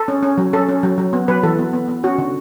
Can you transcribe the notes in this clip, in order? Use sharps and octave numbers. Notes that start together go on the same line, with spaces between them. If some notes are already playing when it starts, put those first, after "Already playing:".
Already playing: A4
C#4
C#4
F#3
C#4 A4
C#4
F#3
F#3
B3
F#3 B4
E3 A4
B3
B3
B3
C#4 F#4
D3